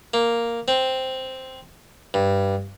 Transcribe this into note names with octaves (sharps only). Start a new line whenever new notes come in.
A#3
C4
G2